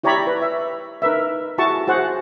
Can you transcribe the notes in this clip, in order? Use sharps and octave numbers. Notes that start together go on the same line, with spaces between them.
E4 G4 C#5 D5 A#5 B5
B4
E5
D#4 A#4 B4 E5
E4 F#4 G#4 A5 C#6
F#4 G#4 C5 F#5